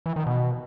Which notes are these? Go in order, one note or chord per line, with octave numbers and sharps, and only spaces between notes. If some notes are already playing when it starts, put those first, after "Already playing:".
E3
D#3
B2